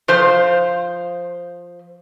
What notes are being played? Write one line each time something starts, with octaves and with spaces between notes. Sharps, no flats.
F3 C5 F5